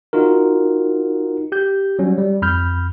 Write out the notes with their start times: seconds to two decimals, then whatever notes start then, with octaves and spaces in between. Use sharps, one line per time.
0.13 D#4 F4 F#4 A#4
1.52 G4 G6
1.99 F#3 G3 C#4
2.18 G3
2.42 F2 B5 F6 G6